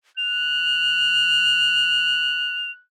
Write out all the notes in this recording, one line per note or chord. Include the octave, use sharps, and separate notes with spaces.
F#6 F7